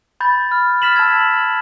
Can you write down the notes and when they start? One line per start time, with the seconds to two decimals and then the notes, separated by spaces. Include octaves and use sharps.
0.20 B5 G6 A6
0.51 F6
0.82 F6 A6 B6 E7 F#7
0.96 A5 E6 G#6